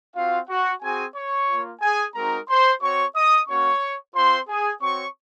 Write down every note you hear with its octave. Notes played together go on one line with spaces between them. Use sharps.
C4 F4 F#4 F5
F#4 F#5
C4 F#4 G#4 G#5
C#5 C#6
A#3 F4
G#4 G#5
G#3 C4 D#4 F#4 A#4 A#5
C5 C6
C4 F#4 C#5 C#6
D#5 D#6
A#3 C#4 F#4 C#5 C#6
C4 F4 C5 C6
G#4 G#5
C4 F#4 C#5 C#6